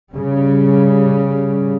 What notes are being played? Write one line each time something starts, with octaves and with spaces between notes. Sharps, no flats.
C#3 G3